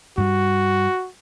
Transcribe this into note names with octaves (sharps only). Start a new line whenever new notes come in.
G2 G3 F#4